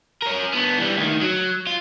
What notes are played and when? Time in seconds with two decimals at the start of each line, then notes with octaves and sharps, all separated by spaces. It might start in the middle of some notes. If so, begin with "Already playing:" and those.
0.22 C#4 A#4
0.53 B3 D4
0.79 E3 G3
0.97 D2 D#3
1.22 F#3
1.67 F4